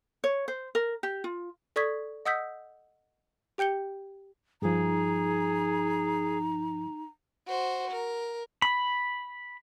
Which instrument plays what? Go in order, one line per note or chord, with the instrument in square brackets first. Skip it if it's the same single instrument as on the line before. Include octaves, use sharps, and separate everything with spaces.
[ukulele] C#5
C5
A#4
G4
F4
[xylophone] A4 D5 C#6 D#6 G#6 B6
D#5 F#5 D#6 E6 G6 B6
G4 G5 G6 C#7 G7
[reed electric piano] G2 F3 [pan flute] D#4 [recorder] G#4 [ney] A#5
[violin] F#4 C5
A#4
[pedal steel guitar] B5